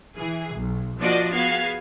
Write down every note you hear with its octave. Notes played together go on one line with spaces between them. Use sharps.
E3 G#4
B1
F3 A#3 D4 F#4 D5 D#5
B3 F#4 G#4 F5 G#6